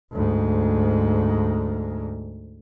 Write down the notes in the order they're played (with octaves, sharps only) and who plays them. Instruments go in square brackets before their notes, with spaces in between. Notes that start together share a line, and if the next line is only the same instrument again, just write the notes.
[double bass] D2 G#2